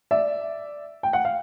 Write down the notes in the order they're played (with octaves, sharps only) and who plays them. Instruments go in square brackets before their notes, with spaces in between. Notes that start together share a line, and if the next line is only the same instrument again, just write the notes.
[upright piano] D5 E5
G5
F#5
F5